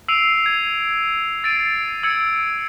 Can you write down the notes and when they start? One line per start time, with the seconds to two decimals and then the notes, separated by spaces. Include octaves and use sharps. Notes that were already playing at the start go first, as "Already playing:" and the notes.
0.08 E6 C7 D7 D#7 F7
0.46 G#6
1.44 E6 A6 C7 D7 D#7
2.03 E6 G#6 C#7